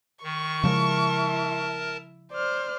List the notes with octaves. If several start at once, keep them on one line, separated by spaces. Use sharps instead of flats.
D#3 C#6
C#3 F3 G#3 E4 A#4 E5 A5
C5 D5 F6